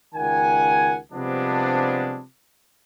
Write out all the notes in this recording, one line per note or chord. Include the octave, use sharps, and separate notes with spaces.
C#2 D#3 F#5 G#5
C3 F3 G3 G#3 B3 D4